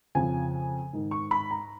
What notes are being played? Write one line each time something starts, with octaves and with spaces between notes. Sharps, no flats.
F2 C#3 F3 G#5
G#2 D#3
C#6
B5
A#5